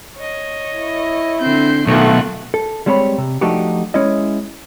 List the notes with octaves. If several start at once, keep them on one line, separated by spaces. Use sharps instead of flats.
C#5 D#5
E4
D3 C4 G6 C7
B1 D#3 A3 B3 F4 C#6 F#6
A4
G3 G#3 C4 C#5 G5 B5
C3
F3 A3 D4 D#4 F#4 G4
G#3 C#4 E4 D#5